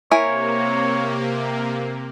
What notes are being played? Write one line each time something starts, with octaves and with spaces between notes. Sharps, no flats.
C3 A#3 E4 A#4 C#5 G#5